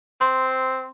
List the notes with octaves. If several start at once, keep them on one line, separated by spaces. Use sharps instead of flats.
C4 C6